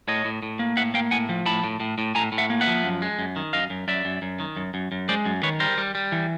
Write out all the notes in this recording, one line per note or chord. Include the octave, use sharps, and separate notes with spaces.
A2 C#5 D#5
A2
A2
A#3
A2 E5 F#5
A#3 F5 G5
A2 F#5 G#5
F3
A2 A5 B5
A2
A2
A2
A2 G#5 A#5
A2
E5 F#5
A#3
E5 F#5
F3
F#2
G#3
F#2
D#3
F#2 D#5 F5
F#2
F#2 D5 E5
F#2
F#2
D#3
F#2
F#2
F#2
G#3 C5 D5
F#2
D#3 B4 C#5
G3 A#4 C5
G3
G3
E3